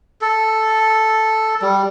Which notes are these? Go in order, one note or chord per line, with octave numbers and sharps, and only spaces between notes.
A4
G3